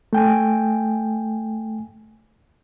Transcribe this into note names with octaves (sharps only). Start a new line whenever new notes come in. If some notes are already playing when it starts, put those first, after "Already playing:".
A3 G5 G#5